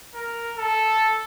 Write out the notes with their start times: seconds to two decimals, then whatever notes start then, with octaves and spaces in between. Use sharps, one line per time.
0.15 A#4
0.58 A4